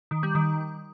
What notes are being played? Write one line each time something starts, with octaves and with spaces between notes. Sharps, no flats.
D#3
G3
D#3